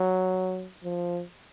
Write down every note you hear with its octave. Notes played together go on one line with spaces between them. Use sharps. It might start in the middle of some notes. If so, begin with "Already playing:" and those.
Already playing: F#3
F3